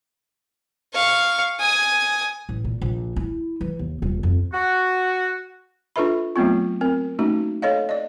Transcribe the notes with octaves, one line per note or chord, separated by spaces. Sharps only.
F5 C#6
G#5 D#6
A1
A#2
A#1
E4
E3
D#2
D#1
F2
F#4
D4 F4 A4 B4 E5 B5
F#3 A3 B3 C4 F4
C4 A#4
A3 A#3 C#4 D#4 F#4
A4 C#5 D#5 F5
D5 D#5